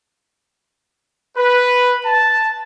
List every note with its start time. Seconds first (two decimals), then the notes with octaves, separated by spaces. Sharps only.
1.37 B4
2.05 A5